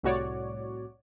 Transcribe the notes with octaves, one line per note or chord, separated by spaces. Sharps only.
C2 A2 F#4 C#5 D5